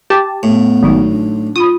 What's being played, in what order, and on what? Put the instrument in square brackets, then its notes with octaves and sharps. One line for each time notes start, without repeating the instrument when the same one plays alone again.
[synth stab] G4 A5
[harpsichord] A2 [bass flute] B3
[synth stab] G#1 [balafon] F#3 D#4 F#4
[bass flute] D4
[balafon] F4 B5 [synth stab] D#6